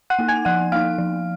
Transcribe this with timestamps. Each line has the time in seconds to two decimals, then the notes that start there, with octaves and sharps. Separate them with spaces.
0.10 F#5 F#6
0.19 A#3 D#4
0.28 G#5 G#6
0.45 F3 F#5 F#6
0.72 A#3 D#4 F5 F6
0.98 F3